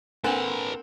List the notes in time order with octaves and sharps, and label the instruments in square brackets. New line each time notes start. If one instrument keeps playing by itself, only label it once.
[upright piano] A#3 C4 F#5 [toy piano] D4 G#5 [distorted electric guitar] A4 B4